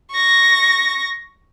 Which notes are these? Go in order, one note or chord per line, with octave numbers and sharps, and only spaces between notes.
C#6 A#6